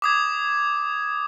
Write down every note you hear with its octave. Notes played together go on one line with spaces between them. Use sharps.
D6 D#6 G#6